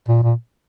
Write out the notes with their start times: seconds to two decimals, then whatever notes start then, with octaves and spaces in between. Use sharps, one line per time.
0.08 A#2
0.23 A#2